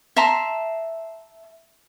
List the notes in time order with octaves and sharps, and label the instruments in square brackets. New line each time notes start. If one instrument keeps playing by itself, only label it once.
[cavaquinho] E5 A5 A#5 C6